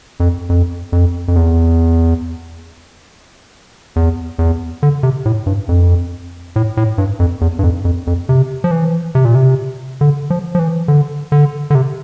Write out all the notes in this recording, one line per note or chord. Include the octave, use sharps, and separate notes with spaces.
F2
F2
F2
F2
E2
E2
E2
D3
C3
A2
G2
F2
A2
A2
G2
F2
E2
G2
F2
F2
F2
C3
F3
E3
C3
A#2
C3
D3
F3
F3
E3
D3
D3
D3
C3